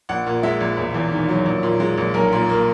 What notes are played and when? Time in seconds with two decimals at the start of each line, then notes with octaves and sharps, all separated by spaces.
0.09 A#1 F#5
0.27 A#2
0.43 G#3 E5
0.61 A#1
0.77 E1
0.94 E2
1.12 D#3
1.29 F#3
1.46 A#1
1.63 A#2
1.80 G#3
1.98 A#1
2.14 B1 A#4
2.32 A#2
2.49 A#3